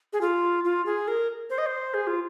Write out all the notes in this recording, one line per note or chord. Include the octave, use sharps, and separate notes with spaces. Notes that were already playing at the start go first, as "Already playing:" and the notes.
G#4
F4
F4
G#4
A#4
C5
D#5
C5
G#4
F4